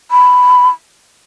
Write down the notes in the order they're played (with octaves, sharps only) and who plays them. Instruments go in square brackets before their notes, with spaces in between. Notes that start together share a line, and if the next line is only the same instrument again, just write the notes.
[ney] B5